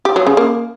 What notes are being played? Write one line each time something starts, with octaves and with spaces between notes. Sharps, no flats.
G4
F#3
C#3
A#3